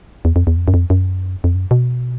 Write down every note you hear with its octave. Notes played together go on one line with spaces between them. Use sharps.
E2
F2
E2
F2
F#2
F2
F#2
F2
F#2
B2